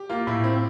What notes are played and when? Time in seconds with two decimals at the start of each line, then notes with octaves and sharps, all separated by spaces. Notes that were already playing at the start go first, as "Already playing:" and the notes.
Already playing: G4
0.09 A#3 F4
0.27 A2 E4
0.44 C4